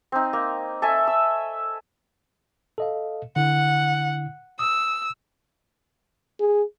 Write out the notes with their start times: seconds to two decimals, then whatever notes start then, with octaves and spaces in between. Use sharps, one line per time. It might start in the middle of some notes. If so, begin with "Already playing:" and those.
0.12 C4 D#4
0.33 A#3
0.82 A4 E5 G#5 C#6
1.08 E6
2.78 A4 D#5 F5
3.36 D3 E4 F#5
4.59 D#6 E6
6.40 G#4